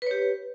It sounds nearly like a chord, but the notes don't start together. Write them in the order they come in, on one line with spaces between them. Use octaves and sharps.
B4 C#5 G4